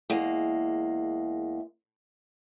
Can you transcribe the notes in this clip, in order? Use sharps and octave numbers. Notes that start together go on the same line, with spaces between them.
E2 G#3 A#3